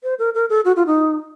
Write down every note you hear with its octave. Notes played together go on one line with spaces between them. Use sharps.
C5
A#4
A#4
A4
F#4
F4
D#4